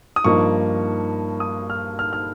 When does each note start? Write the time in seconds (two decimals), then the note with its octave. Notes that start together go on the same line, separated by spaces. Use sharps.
0.16 D#6
0.24 G2 F3 A#3 D#4 C#6
1.40 D#6
1.70 F6
1.99 F6
2.13 F6